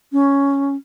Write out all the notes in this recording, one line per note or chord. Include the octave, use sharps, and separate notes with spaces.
C#4